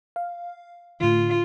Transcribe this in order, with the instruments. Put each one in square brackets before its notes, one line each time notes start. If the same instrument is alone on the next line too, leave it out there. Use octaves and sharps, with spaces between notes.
[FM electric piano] F5
[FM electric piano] A2 D3 [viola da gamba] F4